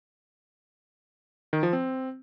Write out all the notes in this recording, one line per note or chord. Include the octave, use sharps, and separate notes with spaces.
D#3
F3
C4